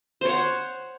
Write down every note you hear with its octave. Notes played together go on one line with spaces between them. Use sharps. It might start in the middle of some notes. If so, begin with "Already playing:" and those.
C5 C#5 F#5